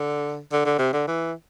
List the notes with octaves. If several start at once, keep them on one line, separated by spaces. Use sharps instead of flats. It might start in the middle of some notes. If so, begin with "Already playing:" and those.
Already playing: D3
D3
D3
C3
D3
E3